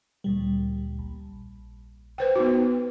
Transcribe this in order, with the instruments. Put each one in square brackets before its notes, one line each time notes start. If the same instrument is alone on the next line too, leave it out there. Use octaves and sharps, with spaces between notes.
[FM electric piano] D2 A#2 G3
A#1
[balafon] B4 C5 G5
B3 D#4 F#4